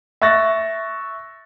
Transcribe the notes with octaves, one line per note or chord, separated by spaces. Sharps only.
E5 C#6 F#6 A6 A#6